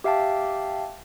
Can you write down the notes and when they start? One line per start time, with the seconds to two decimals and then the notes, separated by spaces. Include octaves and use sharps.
0.04 G4 E5 F5 G5 A5